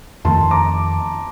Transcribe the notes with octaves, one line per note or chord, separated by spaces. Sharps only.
F2 D#3 A3 A5 C6
A#5 D6